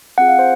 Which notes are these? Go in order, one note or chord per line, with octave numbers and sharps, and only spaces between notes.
C4 F4 G#4 F#5
F5
C5